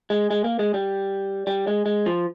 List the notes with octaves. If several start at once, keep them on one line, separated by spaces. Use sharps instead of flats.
G#3
G#3
A#3
G#3
G3
G3
G#3
G#3
F3